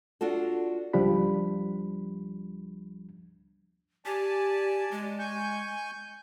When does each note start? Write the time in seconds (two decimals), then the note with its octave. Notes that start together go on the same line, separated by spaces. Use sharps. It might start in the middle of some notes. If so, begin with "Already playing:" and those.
0.21 D4 F4 F#4 A4
0.93 C#2 F3 G3 D4 B5
4.06 G4 D5 G#5 A5
4.91 G#3
5.19 G#5 C#6 G6